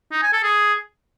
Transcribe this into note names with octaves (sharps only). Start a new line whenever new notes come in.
D#4
G#5
A4
G#4